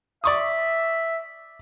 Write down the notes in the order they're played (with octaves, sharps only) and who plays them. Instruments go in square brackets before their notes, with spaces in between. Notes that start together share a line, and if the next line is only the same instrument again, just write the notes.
[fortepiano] D5 C#6 D#6 [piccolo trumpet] E5